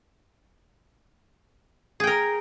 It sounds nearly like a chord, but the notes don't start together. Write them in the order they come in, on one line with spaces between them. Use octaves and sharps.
G#4 G5 A#4